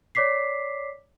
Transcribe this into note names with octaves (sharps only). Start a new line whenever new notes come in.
C#5 D5 D6 B6 C7